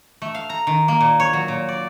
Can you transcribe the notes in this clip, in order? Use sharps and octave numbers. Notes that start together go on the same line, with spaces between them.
A3
F5
A#5
D#3
A#3
A#2
C#5
F#3
A#2
D5